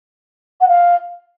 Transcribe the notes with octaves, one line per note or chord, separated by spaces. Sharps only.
F#5
F5